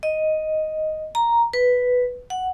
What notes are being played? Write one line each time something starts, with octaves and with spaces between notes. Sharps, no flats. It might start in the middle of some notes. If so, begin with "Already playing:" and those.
D#5
A#5
B4
F#5